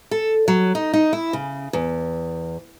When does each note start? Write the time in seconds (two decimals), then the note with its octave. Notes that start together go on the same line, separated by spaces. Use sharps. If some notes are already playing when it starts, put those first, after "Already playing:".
0.11 A4
0.48 F#3
0.75 D#4
0.93 D#4
1.13 E4
1.33 C#3
1.73 E2